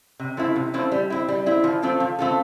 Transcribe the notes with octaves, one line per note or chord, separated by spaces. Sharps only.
C3
F3 A3 C4 E4
C3
F3 A3 C4 E4
G3
C4 E4
G3
C4 E4
F3
A3 C4 F4 A4
F3
A3 C4 F4 A4